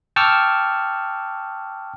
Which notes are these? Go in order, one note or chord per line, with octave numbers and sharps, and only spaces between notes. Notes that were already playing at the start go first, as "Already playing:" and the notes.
G5 A5 C#6 D6 E6 F6